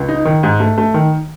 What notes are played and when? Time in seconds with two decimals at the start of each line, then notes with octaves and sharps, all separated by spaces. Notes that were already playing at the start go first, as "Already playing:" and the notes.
Already playing: C#2
0.08 D#4
0.25 D#3
0.43 G#2
0.60 A3
0.78 A3
0.94 D#3